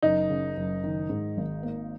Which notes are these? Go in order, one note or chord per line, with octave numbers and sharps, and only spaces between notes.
F#1 D#4
C#3
F#1
D#3
G#2
G#1
A#3